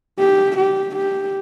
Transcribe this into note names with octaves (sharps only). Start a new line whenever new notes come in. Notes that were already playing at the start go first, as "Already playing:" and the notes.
G4
G4
G4